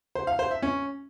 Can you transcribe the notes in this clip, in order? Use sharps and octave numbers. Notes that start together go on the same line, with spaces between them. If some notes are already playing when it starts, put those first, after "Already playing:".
C5
F5
C5
E5
C#4